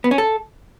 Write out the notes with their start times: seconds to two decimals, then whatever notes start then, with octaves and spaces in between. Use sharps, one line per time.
0.04 B3
0.11 C#4
0.18 A4